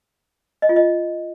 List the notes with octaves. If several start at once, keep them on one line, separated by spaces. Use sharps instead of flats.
D#5
F4
D#5